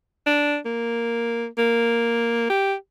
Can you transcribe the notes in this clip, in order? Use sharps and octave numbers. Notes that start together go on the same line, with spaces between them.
D4
A#3
A#3
G4